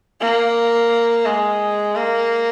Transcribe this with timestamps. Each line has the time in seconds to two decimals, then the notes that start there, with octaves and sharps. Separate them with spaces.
0.21 A#3
1.26 G#3
1.96 A#3